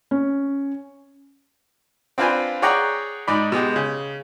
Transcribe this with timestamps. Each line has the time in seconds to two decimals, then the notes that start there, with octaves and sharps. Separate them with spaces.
0.11 C#4
2.18 C4 D4 F4 B4 C5 G#5
2.62 G#4 C#5 D5 F#5 G5 A#5
3.27 G#2 D#4 D5 B5
3.52 B2 G#3 G4
3.76 C#3